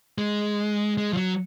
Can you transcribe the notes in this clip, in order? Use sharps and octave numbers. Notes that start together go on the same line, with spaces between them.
G#3
G#3
F3
F#3